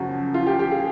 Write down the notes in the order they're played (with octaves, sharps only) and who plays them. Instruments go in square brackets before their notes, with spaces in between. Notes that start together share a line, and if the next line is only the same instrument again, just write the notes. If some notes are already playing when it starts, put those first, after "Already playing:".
Already playing: [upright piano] F#2 C#3 F3 F#4
F4
G4
G4
G#4